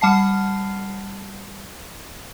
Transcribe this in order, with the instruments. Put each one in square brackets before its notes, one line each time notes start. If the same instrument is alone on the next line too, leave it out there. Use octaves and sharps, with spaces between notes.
[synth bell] G3 F#5 A5 C7